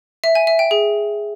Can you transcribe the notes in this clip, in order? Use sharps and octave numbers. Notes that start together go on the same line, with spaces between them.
E5
G#5
E5
G5
G#4